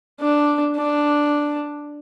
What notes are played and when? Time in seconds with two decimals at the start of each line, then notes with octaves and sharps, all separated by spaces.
0.20 D4
0.77 D4